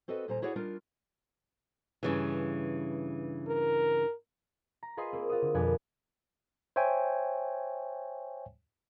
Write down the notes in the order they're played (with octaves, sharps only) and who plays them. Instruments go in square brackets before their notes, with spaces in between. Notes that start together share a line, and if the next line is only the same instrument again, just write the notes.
[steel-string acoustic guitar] C4 F#4 A4 B4 D#5
D#2 A#2 G3 C5 G#5 A#5
E4 F#4 G#4 C#5 D5 F#5
G3 D4 D#4 F4 A#4
[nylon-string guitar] G2 C#3 E3
[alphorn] A#4
[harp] A#5
F4 G#4 B4 D#5 C6
A#3 C4
F4 F#4 D#6
D3
F2 B2 A#3 D4 B4 G#5
[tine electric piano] C5 C#5 E5 G5 G#5